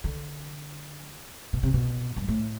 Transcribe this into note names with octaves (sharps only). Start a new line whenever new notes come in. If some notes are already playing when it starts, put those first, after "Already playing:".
D3
B2
C3
B2
G2
A2